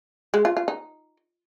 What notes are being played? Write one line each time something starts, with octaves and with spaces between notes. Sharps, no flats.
G#3
F4
F4
D#4